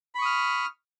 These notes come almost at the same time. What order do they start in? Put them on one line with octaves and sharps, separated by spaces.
B5 C#6 D#6 F6